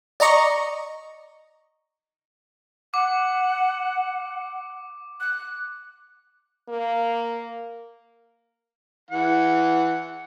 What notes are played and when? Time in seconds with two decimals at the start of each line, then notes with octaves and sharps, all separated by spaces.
0.20 D5 D#5 A#5 C#6
2.94 F#5 D6
5.20 F#6
6.68 A#3
9.10 E3 F#5